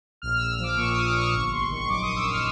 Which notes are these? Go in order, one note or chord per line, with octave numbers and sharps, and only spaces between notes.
A#1 F6
A#1 E6
F3 D6
A#2 C#6
A#1 D#6
D6
A#1 C#6
G1 C#6
G1 C6
D#3 C#6
C#6
F#2 D6
G1 D#6
E6
F6